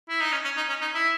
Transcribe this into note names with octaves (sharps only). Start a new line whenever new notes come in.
E4
D#4
C#4
C#4
D#4
C#4
D#4
E4